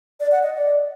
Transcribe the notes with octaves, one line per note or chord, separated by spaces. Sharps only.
D5
F#5
D#5
D5